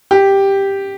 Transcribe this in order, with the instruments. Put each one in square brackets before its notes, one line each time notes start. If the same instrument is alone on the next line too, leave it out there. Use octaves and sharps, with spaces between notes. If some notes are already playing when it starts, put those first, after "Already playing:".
[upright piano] G4